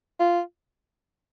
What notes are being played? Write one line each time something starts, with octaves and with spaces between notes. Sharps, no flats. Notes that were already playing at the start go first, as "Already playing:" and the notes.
F4